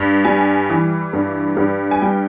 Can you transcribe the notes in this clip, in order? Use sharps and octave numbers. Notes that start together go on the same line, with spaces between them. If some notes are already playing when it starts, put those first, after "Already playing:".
Already playing: G2
G3 G#5
E3
G2
G2
G#5
G3 G5